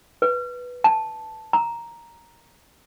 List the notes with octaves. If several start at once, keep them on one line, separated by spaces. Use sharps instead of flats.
B4
A5
A#5